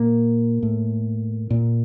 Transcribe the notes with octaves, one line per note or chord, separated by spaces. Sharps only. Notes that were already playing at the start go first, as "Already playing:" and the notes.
Already playing: A#2 A#3
A2
A#2